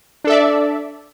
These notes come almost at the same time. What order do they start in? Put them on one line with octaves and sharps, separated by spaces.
D4 A4 E5 D5